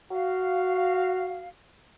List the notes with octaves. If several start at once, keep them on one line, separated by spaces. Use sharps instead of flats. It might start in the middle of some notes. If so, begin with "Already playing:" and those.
F#4 F5